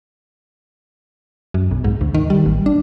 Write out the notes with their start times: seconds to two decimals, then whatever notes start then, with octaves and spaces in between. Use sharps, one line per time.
1.54 F#2
1.71 B1
1.84 G#2
2.01 D2
2.14 D#3
2.30 G3
2.46 A1
2.66 D4